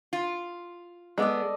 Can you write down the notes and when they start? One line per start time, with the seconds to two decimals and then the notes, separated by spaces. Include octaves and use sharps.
0.13 F4
1.18 G#3 B3 A4 D5 D#5